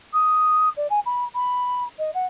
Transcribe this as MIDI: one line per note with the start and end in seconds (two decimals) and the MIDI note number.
0.13 0.69 87
0.76 0.87 74
0.90 0.99 80
1.05 1.24 83
1.34 1.84 83
1.98 2.10 75
2.14 2.26 78